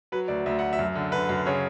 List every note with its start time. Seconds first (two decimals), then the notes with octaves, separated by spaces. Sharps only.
0.12 F#3 B4
0.28 D2 D5
0.46 D2 E5
0.59 D2 F#5
0.73 E5
0.79 F#2
0.95 D3
1.12 D3 B4
1.29 F#2
1.46 C#3 C#5